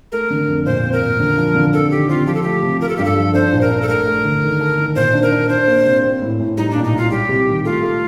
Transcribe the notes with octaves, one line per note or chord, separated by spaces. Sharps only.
A3 A#4
D3
F2
A#2 C5
C4
A#4
A#2
D3
F3
D3
C4 A4
D#3 G4
C4 F4
F3 G4
A4
A3 G4
C3
F4 A#4
A4
G2 G4
A4
F3
D4 C5
A#1
A#4
D4
A4
A3 A#4
A3
D2
D#3
A4
D#3
A#2 C5
D4
A#4
D4
D4 C5
A#3
C3
C4
A2
A2
G3 D#4
A#2 D4
D#4
C2 F4
G3 G4
C3
D#3
A3 F4
A3